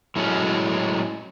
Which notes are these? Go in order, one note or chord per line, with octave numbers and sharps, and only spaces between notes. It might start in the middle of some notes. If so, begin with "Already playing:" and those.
A2 F#3 G#3 C#4